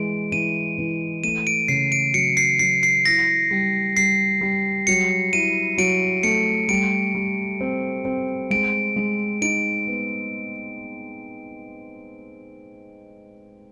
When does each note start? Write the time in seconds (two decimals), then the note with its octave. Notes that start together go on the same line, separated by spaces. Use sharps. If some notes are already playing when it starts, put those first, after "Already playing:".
Already playing: E3 G#3 D7
0.32 E3 D#7
0.78 E3
1.24 A3 D#7
1.47 D7
1.68 C#3 C7
1.92 D7
2.14 F#3 C#7
2.37 C7
2.59 F#3 C7
2.83 C7
3.06 E4 A#6
3.51 G3
3.97 G3 C7
4.41 G3
4.87 F#3 C#7
5.33 E4 D#7
5.78 F#3 D7
6.23 A3 C#7
6.69 G3 D7
7.15 G3
7.61 C4
8.05 C4
8.50 G#3 D7
8.96 G#3
9.42 D#4 D7
9.87 B3